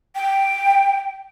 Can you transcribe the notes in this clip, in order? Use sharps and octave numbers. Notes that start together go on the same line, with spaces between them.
G5